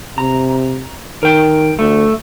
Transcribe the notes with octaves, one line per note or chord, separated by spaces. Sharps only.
C3 A#5
D#3 A#4 G5
D2 A3